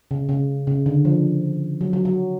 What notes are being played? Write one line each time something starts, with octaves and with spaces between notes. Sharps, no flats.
C#3
C#3
C#3
D3
F3
F#3
F#3
F#3